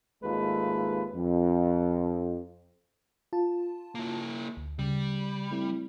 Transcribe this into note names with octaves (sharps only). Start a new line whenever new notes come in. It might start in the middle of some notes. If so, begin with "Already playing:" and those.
G#1 D#2 G#3 A3 F4 B4
F2
F4 A5
A#3 E4
D2
C#3 G3
A3 C4 E4